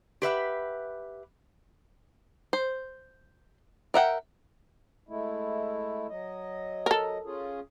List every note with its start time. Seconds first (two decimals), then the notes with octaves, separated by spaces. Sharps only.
0.22 G4 B4 E5 F#5
2.53 C5
3.94 A#4 E5 F#5 G5
5.09 G#3 A3 E4
6.09 F#3 D#5
6.86 A4 A#4
7.25 C#4 F4 G#4